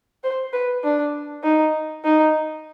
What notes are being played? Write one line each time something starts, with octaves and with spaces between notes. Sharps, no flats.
C5
B4
D4
D#4
D#4